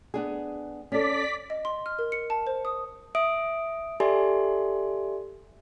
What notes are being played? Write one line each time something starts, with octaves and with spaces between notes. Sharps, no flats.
B3 D4 G#4
C#4 A4 D5 B6
D#5
C6
F6
A#4
C#7
A5
C5
D#6
E5 D#6 D7
G4 A4 D5 E5 G#5 C6